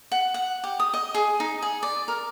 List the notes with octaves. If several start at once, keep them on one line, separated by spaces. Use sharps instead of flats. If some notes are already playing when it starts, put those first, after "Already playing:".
F#5
F#5
G4
D#6
D#5
G#4
D#4
G#4
D5
A#4